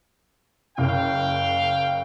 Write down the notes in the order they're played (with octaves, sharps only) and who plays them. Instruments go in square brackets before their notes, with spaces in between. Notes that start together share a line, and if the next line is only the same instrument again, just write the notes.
[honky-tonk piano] F#1 [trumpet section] F5 G5